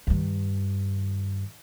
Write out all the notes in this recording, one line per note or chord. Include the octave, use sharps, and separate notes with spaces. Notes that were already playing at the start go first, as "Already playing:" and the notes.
G2 D#3